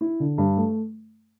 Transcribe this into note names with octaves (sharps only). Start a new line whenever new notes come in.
E4
D3
G2
A3